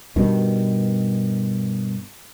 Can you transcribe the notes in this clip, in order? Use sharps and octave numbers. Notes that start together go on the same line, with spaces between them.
G2 B2 D#3